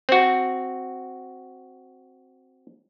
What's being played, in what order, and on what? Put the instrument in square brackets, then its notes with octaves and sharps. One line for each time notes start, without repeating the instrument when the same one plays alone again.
[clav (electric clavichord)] C4 F#4